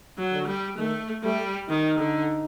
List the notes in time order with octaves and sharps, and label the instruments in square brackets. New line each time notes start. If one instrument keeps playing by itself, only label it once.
[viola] F#3
[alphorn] D3
[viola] G3
[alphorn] D#3 [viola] A3
[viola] G3 [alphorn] A3
[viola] D#3 [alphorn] D#4
[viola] D3